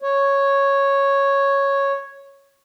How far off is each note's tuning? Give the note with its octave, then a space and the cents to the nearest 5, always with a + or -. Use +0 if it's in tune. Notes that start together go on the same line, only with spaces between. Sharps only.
C#5 -5